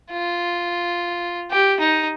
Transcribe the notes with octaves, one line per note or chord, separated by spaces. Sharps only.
F4
G4
D#4